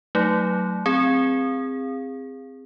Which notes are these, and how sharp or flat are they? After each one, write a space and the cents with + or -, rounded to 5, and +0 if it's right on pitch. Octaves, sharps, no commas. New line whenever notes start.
F#3 +0 A3 +0 D#4 +0
C4 +0 G#4 -25